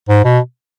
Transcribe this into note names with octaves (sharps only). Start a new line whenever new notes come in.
G#2
B2